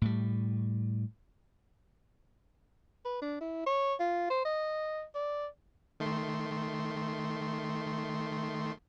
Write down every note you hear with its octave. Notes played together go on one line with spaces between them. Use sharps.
A2 G3
B4
D4
E4
C#5
F4
C5
D#5
D5
D#3 A3 C6